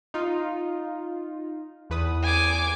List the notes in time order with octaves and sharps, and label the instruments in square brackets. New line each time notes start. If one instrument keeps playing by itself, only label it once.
[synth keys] D#4 F4
E2 B4 D#6
[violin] G#5 D6